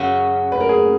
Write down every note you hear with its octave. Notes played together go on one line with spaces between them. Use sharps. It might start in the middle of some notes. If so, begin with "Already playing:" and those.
Already playing: F#2 C#3 F#3 C#4 F#4
B4
A#4
G#4